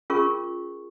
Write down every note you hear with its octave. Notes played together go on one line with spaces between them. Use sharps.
C#4 F4 G#4 A#4 C#6